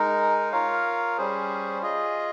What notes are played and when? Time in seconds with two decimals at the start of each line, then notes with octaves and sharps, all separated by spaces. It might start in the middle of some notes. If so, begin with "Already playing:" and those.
Already playing: G#3 D#4 A#4
0.52 F4 A#4 C#5 F5
1.18 G3 C#4 G#4 C5
1.82 F4 G#4 D#5